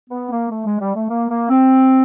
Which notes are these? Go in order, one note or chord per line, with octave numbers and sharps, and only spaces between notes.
B3
A#3
A3
G#3
G3
A3
A#3
A#3
C4